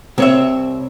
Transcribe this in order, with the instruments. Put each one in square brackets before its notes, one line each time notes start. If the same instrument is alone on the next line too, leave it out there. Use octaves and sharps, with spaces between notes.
[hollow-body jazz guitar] C2 C#5 E5 [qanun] C4